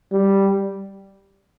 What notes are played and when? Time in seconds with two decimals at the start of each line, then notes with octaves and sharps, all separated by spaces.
0.12 G3